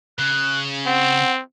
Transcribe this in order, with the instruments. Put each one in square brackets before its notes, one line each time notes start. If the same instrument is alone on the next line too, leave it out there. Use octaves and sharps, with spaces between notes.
[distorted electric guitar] C#3 [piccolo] F#6
[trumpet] C4 [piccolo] F#5